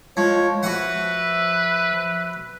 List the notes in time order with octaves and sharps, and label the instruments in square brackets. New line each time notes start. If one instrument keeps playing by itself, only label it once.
[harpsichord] F3 [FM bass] G#3 [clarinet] C#5
[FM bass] F3 [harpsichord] F#4 F#5 [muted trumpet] B4 [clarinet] E5